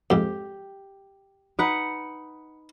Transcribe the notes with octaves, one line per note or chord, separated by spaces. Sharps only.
F2 G#2 G4
D#4 B4 F#5